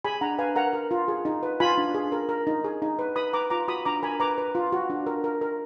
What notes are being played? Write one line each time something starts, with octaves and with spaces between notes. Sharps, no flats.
G#4 G#5 B5
D4 F#5 A#5
B4 F5 G#5
A#4 F#5 A#5
A#4
F4
G#4
D#4
B4
F4 G#5 B5
D4
G#4
A#4
A#4
D#4
G#4
D#4
B4
B4 B5 D#6
B4 A#5 D6
F4 A#5 D6
F#4 B5 D#6
D4 A#5 D6
A#4 G#5 B5
B4 A#5 D6
B4
F4
F#4
D4
A#4
A#4
A#4